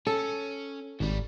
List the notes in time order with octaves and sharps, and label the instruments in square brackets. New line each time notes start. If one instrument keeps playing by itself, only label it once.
[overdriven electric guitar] C#4 [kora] A4
[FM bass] G#1 [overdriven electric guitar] F#2 G3